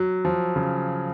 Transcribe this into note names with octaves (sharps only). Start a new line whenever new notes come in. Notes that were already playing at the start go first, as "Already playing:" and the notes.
Already playing: F#3
F3
C#3